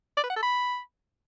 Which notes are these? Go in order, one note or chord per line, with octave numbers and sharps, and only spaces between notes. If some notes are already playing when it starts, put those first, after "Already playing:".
D5
B4
F#5
A4
B5